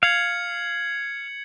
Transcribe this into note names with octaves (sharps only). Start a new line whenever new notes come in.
F5 G#6 C#7 F#7